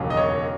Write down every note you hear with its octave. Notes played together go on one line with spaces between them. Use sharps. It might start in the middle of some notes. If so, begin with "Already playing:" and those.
Already playing: E1 D#2 C#3 F#3
D#5
C#5